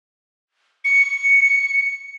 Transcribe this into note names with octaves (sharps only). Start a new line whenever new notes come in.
C#7